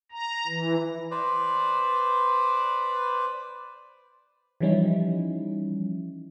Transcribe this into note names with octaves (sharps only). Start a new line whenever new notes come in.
A#5
E3
B4 C5 D5
E3 F3 G3 C#4 D#4 E4